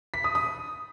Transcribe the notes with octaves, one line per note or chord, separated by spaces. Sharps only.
B6
D#6
D#6